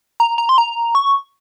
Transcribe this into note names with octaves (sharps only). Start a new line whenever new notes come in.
A#5
A#5
C6
A#5
C#6